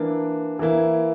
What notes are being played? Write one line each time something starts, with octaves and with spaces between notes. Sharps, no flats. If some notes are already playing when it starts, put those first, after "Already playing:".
Already playing: E3 A#3 D4
E3 A#3 E4